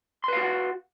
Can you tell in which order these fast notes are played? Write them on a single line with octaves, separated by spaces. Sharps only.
C6 B4 F5 F#4 F#5